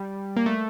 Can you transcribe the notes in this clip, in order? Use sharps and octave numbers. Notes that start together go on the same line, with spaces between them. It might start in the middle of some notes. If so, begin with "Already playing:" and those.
Already playing: G3
A#3
A3